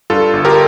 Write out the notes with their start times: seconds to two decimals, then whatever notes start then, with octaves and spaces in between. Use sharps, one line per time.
0.10 G2 F4 A4
0.33 G1
0.45 G4 A#4